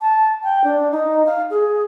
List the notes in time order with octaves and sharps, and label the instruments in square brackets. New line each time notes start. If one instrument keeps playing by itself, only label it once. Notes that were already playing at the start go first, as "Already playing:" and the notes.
[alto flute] A5
G5
D4
D#4
F5
G#4